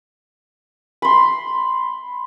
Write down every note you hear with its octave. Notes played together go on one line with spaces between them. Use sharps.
B5 C6